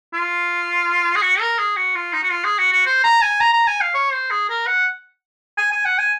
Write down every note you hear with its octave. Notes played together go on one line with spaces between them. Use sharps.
F4
G#4
F#4
A#4
G#4
F#4
F4
D#4
F#4
F4
G#4
F#4
F#4
C5
A#5
G#5
A#5
A#5
G#5
F5
C#5
C5
G#4
A#4
F#5
G#5
G#5
F#5
G#5